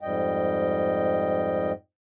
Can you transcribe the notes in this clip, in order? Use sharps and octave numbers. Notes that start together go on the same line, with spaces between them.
F2 G#2 G3 D#5 G5